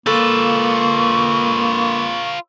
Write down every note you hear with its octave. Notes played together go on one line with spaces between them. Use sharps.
A#3 F4 A4 B4 C#6